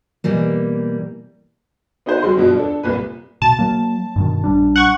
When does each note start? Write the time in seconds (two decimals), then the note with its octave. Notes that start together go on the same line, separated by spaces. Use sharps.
0.24 B2 E3 G3 A#3
2.06 B3 D#4 F#4 B4 C5
2.22 F#3 G3 G#4 C6
2.37 G2 B2 F3 F#3
2.57 D4 A4
2.83 C2 A#2 B4
3.42 B2 A5
3.59 F#3 A#3
4.16 G2 B2 D#3
4.44 A#1 G3 D4
4.76 F#5 C#6